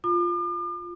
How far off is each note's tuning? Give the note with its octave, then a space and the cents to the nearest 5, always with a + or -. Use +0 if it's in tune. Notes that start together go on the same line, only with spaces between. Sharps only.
F4 +0 D6 +45